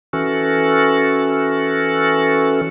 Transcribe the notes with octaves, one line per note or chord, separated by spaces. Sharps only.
E3 C#4 F#4 A4